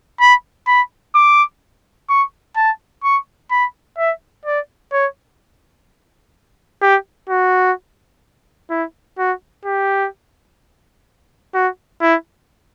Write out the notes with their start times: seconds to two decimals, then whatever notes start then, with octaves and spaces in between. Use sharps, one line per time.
0.20 B5
0.67 B5
1.15 D6
2.09 C#6
2.56 A5
3.03 C#6
3.51 B5
3.98 E5
4.45 D5
4.92 C#5
6.82 G4
7.29 F#4
8.70 E4
9.18 F#4
9.65 G4
11.54 F#4
12.01 E4